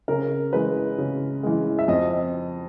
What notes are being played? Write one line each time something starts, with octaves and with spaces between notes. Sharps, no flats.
C#3 A#4
E3 G#3 B4
C#3
E3 G#3
E5
F2 D#5